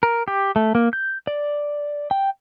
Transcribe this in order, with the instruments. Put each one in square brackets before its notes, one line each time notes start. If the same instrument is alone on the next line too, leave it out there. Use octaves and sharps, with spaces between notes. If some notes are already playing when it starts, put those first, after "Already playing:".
[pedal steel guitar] A#4
G4
A3
A#3
G6
D5
G5